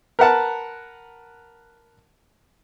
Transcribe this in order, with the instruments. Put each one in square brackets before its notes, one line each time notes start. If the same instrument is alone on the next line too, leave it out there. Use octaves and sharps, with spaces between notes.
[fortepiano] A#4 B4 F#5 A5